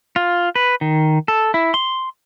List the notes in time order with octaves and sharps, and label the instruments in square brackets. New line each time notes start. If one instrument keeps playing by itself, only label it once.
[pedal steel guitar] F4
B4
D#3
A4
E4
C6